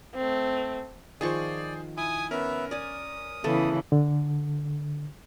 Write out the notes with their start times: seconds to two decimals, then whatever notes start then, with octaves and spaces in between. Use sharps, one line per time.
0.14 A3 C4
1.21 D#3 F3 G#4 C5 D5 C#6
1.98 E4 G#5 D#6
2.31 B3 C#4 A#4 E5
2.71 D5 G#5 D#6
3.44 C#3 E3 A3 B3 A4
3.92 D3